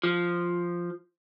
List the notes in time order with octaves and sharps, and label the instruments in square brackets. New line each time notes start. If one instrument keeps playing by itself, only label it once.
[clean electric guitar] F3